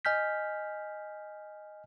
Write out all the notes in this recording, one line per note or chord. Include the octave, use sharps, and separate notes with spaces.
D#5 G#5 F6 G6 B6